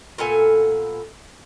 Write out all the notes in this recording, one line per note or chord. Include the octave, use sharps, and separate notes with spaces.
A#2 B3 A4 G#5